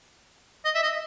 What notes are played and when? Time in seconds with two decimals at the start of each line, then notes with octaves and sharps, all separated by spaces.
0.65 D#5
0.75 E5
0.83 D#5